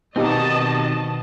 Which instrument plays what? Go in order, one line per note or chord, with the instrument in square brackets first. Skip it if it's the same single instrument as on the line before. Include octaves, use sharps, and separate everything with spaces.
[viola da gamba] B2 [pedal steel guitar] D#3 C4 [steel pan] B3 D#4 G4 [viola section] D#5 A5